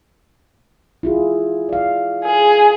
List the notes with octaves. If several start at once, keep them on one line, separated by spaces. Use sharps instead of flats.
E4 F4 G#4
D5 F5
G#4